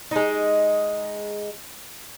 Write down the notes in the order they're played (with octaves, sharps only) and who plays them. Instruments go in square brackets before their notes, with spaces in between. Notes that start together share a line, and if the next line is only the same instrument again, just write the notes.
[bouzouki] G#3 D#4